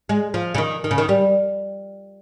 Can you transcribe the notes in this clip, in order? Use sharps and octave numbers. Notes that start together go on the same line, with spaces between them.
G#3
F3
C#3
D#3
D#3
C#3
D#3
G3